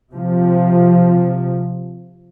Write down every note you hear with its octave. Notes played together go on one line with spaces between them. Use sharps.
C3 F3